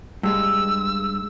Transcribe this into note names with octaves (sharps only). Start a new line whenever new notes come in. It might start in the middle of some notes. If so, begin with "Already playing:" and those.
G2 G#3 E6